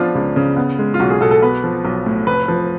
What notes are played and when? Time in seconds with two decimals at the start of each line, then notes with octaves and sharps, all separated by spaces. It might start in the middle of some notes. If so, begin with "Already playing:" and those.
Already playing: F3 B3 D4 F4
0.15 C#2
0.36 C#3
0.57 B3
0.79 G#3
0.94 F4
1.00 B1 F#4
1.10 G#4
1.20 B2 A4
1.31 A4
1.42 B3 B4
1.64 F3
1.85 B1
2.06 A2
2.27 F1 B4
2.48 F3